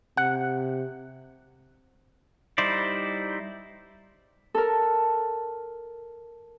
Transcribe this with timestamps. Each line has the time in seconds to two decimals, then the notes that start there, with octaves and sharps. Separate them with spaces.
0.17 C3 F#5
2.58 G3 D#4 E4 C5 D5
4.54 A4 A#4